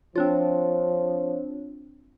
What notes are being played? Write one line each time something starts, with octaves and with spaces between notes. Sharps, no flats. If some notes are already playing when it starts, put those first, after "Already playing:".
F3 C4 D4 F4 C#5